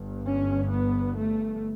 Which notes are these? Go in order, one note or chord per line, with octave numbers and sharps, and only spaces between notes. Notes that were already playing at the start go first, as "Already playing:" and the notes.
Already playing: G1 G2
C#4
B3
A3